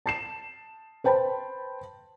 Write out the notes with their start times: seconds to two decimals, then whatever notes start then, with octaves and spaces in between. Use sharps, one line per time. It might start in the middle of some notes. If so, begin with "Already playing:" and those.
0.06 A5 C7 E7
1.04 B4 C5 G5 A5 B5